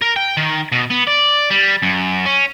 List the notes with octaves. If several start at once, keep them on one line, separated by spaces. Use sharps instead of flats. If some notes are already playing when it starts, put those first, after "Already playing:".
A#4
G5
D#3
B2
B3
D5
G3
F#2
C#4